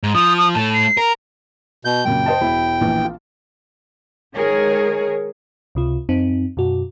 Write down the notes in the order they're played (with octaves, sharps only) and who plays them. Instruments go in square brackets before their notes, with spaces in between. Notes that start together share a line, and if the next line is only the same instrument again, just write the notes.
[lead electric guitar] G#2
[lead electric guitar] F3 [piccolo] D#6
[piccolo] D#6
[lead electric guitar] A2 A3 [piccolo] A5
[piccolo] C7
[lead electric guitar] A#4
[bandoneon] B2 G6
[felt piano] F#2 A#2 C#3 [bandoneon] G5
[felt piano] C5 D#5 A5
E1 E4
A#1 E3
F4
[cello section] D#3 G#3 G#4 A#4 C#5
[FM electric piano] C#2 C3 F4
F#2 C4 D#4
F#2 B2 F#4